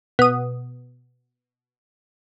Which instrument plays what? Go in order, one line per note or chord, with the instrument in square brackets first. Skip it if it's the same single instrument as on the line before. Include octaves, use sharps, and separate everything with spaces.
[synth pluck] B2 D#6